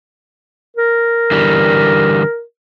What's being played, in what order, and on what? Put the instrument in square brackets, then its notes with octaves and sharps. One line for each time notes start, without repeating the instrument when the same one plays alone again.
[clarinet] A#4
[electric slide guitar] D3 E3 G3